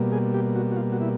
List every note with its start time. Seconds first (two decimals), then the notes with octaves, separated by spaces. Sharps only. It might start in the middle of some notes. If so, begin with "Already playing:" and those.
Already playing: B2 G3 A#3
0.12 G#4
0.34 G4
0.55 F#4
0.72 F#4
0.76 F4
0.92 F#4
1.01 E4